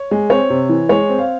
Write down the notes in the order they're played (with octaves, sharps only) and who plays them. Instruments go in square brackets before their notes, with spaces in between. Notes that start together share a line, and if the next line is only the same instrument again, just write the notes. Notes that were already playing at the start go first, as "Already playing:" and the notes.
Already playing: [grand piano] C#5
G#3
C4 C#5
C3
E3
G#3 C#5
C4
F5